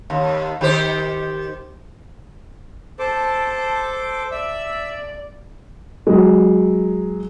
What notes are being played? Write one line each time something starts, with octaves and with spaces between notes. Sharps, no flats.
D#2
D#3 G4 C5
A4 C5 A5 D6
D5 E5 E6
F#3 G#3